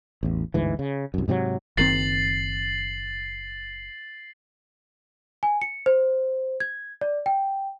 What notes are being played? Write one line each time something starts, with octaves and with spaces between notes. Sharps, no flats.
A1 E2
G1 D2 G#2 E3
C#3
C2 F#2
G#2 C3 F3 F#3
F#1 D#3 C4 A6 C7 F#7
G#5
C#7
C5
G#6
D5
G5